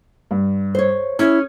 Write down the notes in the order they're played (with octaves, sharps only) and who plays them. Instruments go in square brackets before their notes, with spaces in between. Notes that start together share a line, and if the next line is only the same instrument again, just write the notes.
[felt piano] G2
[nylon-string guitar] C5 C#5
[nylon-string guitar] C#4 G#4 [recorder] E4 [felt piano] G#6